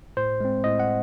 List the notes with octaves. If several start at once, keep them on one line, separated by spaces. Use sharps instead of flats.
A2 C5
G#3 C4
A2 D#5
F#5